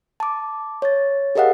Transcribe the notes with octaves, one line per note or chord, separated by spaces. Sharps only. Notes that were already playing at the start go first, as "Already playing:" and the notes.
A5 D6
C#5 A6
G4 G#4 A#4 D#5 F5 F#5